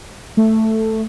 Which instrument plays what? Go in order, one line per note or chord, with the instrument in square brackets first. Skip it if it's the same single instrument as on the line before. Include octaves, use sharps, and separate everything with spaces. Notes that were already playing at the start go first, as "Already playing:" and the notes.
[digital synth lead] A3